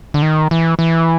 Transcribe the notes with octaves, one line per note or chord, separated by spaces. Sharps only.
D3
D#3
E3
E3